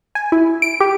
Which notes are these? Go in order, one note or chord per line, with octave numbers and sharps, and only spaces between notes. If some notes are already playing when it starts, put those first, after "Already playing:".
G#5
E4
D7
G4